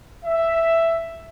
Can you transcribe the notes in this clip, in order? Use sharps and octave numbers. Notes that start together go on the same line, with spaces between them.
E5